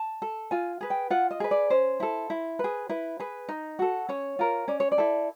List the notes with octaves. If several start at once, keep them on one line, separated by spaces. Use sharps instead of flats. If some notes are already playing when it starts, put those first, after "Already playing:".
Already playing: A5
A4
F4 G#5
G#4 B4
G5
F4 F#5
D#5
G#4 B4
D5
C#4 C5
E4 A4
E4
G#4 B4
E4 B4
G#4 B4
D#4
F#4 A4
C#4 C#5
F4 A#4
C#4 D5
C#5
D5
E4 A4